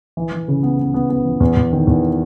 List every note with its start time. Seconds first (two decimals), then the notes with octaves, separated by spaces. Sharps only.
0.17 E3
0.32 E3
0.48 C#3
0.63 B3
0.79 B3
0.94 B3
1.10 B3
1.25 E3
1.40 E2
1.56 E2
1.73 D#3
1.87 E2